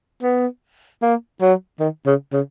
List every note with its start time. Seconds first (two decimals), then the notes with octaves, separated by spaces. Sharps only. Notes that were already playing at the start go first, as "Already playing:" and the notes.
0.23 B3
1.02 A#3
1.42 F#3
1.80 D#3
2.07 C#3
2.33 C#3